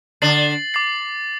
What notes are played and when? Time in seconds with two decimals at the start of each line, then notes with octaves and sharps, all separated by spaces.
0.22 D3 D4 A6 C7 F#7
0.74 D6 A6 C7